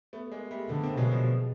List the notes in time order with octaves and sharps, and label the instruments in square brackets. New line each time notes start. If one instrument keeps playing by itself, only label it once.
[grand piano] A3 B3
G#3 A#3
G3 A3
[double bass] D3 [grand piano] A3 B3
[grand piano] A#3 C4
[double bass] B2 [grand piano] F#3 G#3
[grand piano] F3 G3